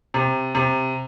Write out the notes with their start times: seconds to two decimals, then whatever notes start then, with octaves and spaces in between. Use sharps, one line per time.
0.14 C3
0.55 C3